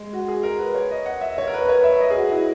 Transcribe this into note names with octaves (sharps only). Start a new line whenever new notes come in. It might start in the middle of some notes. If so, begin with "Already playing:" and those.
Already playing: G#3
F#4
G#4
A#4
B4
C#5
D#5
F#5
E5
C#5
A#4
B4
B4
C#5
E5
D#5
G#4
F#4
E4